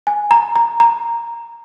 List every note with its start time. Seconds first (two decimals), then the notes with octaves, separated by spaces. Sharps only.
0.07 G#5
0.31 A#5
0.56 A#5
0.80 A#5